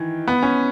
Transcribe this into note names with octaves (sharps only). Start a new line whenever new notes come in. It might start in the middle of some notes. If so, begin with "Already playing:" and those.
Already playing: D#3 E3
B3
C#4